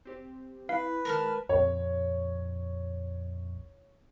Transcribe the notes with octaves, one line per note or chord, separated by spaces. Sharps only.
C4 G4 C5
E4 B4 F5
D#3 G#3 A#4 A5 F6
A#1 F2 C#5